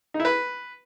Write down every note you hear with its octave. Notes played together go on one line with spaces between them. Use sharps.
D#4
E4
B4